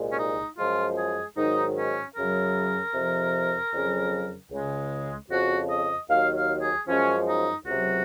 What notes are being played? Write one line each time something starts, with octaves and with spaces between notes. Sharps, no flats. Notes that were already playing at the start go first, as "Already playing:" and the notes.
Already playing: C2 A#2 G#3
C#4
D#4
F#2 F3 G#3 F4
G#4
G#2 D#3 F#3 D#4
C#4
F#2 C#3 F#3 A#4
F2 C3 F3
F2 C#3 F#3
C#2 C#3 G#3
F2 C#3 F3 F#4
D#5
D#2 D#3 F#3 F5
F5
G#4
F#2 F3 G#3 C#4
D#4
C#2 C3 F#3 F#4